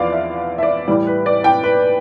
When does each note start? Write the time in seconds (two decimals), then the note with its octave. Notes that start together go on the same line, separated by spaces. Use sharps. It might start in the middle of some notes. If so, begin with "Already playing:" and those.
Already playing: E2 F3 B3 D5 F5
0.12 E5
0.58 E5
0.63 D5
0.88 A2 E3 G3 D5
1.07 B4
1.26 D5
1.44 G5
1.64 B4